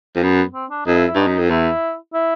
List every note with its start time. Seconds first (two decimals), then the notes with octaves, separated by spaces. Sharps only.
0.15 F2
0.22 F#2 B3
0.54 C4
0.70 D4
0.86 F2 D#4
0.97 E4
1.08 E4
1.15 G2 D#4
1.27 F#2
1.38 F2
1.50 E2 E4
2.14 E4